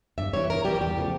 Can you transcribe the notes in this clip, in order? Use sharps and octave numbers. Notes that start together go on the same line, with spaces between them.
G2 E5
E3 G3 C#5
G2 A#4
E3 G3 G4
E2 G4
C#3 F3 A3